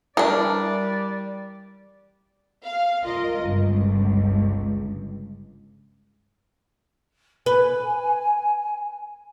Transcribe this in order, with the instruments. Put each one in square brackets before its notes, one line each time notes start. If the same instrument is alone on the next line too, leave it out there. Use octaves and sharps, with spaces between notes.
[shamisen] E3 [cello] G3 D5 [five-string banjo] D4 A#4
[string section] F5
F4 A#4 D#5
G1 C#2
[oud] B4 [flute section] G#5